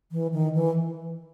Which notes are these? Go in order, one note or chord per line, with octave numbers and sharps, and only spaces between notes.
E3
D#3
E3